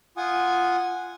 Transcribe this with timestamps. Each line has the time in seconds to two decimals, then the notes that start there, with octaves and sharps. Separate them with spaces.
0.17 F4 F#5 G#5 D#6